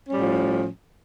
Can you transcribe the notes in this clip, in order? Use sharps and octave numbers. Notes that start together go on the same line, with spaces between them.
A2 F3 G3 C#4